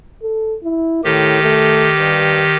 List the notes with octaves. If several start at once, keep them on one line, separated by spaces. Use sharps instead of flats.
A4
E4
A2 D#3 G4
A3
G2